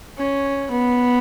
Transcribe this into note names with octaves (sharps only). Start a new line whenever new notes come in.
C#4
B3